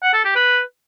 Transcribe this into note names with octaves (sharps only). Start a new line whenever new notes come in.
F#5
A4
G4
B4